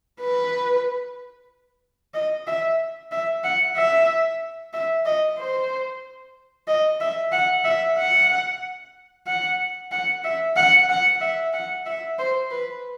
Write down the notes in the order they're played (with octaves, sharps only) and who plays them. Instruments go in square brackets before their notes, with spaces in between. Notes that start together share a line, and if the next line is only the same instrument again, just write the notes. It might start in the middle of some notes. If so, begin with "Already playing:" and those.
[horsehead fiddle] B4
D#5
E5
E5
F#5
E5
E5
D#5
C5
D#5
E5
F#5
E5
F#5
F#5
F#5
E5
F#5
F#5
E5
F#5
E5
C5
B4